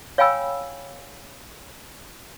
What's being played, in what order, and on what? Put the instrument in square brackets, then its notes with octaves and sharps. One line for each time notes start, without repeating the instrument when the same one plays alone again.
[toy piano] C#5 F5 G5 G#5 B5 E6